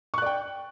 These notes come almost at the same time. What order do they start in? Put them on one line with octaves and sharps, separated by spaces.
C#6 F#6 D5 G5